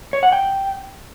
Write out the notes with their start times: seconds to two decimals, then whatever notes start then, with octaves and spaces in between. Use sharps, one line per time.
0.13 C#5
0.23 F#5
0.32 G5